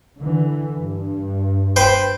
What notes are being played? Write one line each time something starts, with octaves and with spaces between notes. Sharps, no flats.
D3 E3
G2
B4 C5 G5